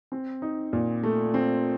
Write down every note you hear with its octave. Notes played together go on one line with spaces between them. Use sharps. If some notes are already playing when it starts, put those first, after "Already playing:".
C4
D#4
A#2
A3
C4